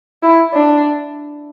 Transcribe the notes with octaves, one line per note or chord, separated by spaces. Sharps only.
E4
D4